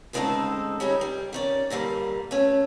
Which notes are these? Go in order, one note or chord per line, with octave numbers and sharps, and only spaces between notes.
D2 C#3 G#3 C4 D#4 A4
G3 C#4 D#4 G#4
G3
D#3 C#4 D5
A#2 D3 G3 A#3
A3 C#4